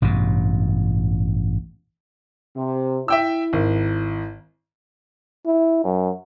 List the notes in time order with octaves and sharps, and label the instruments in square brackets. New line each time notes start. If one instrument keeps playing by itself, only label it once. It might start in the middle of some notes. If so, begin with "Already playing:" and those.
[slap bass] A1 G2 B2
[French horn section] C3
[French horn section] E4 [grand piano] E5 G5 E6
[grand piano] G#1
[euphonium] E4
F#2